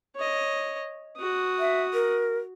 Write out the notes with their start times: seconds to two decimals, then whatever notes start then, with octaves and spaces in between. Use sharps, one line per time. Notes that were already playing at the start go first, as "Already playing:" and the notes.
0.16 C#5 D#5
1.17 F#4 D#6
1.59 E5
1.94 A#4